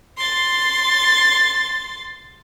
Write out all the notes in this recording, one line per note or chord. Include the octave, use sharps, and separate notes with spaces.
C6 A6